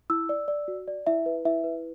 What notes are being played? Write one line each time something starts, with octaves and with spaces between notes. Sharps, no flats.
E4 E6
D5
D5
F#4
D5
E4 E5
B4
E4 E5
B4